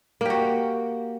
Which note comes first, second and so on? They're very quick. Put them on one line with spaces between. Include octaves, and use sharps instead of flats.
A#3 G4 F#4